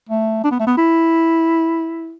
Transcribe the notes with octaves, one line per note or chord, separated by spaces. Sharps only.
A3
D4
B3
A3
B3
E4